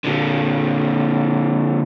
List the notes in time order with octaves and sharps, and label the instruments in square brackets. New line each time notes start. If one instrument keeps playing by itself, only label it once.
[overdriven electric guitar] A#2 D3